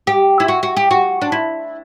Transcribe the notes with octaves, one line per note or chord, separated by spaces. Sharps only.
G4
E4
F#4
F#4
G4
F#4
D4
E4